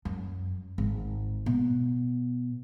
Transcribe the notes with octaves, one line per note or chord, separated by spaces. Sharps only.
F#2
G#1
B2